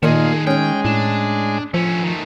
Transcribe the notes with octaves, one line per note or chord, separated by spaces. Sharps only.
A#2 D#3 A3 A#3 D#4 G#4
G#3 C#4 C#5 G5
A2 D4
F3 A3 C#4
D#3 A3